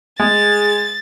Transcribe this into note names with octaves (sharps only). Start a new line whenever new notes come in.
G#3 G#4 A6